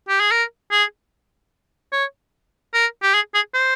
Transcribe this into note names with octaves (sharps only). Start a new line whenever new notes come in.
G4
G#4
A#4
G#4
C#5
A#4
G4
G#4
G#4
C5